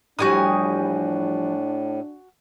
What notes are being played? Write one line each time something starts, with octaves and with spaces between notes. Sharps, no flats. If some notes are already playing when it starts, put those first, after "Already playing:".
A2 E3 F3 G3 D4 F#4 G#5 D#6